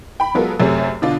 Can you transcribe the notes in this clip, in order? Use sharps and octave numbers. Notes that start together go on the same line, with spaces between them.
G5 B5
F#3 G#3 B3 F4 A4 A#4
F#2 C3 A3 G#4 C#5
B2 D3 D4 F4